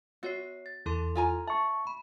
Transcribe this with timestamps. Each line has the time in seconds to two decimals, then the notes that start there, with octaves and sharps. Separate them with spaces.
0.23 B3 F#4 C#5 C7
0.66 A6
0.86 E2 E4 A4 C6
1.15 F4 G#5 A#5
1.48 E5 A5 C#6
1.87 B5